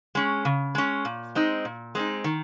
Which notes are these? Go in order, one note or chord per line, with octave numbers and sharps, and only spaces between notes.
G#3 C#4
C#3
G#3 C#4
A#2
G#3 C4 D#4
A#2
G#3 C4 D#4
D#3